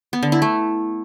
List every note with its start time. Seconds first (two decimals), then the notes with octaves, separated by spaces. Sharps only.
0.13 B3
0.23 D3
0.32 E4
0.42 A3